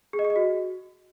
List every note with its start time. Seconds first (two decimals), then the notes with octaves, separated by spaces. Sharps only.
0.13 G#4
0.19 D#5
0.25 G#4
0.30 D#5
0.36 F#4